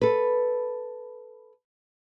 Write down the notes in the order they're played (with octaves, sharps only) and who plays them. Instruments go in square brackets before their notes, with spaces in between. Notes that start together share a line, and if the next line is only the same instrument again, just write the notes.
[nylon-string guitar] A4 B4